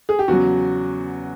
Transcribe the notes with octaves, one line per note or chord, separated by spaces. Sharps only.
G#4
G4
E2 C#3 F#3 F#4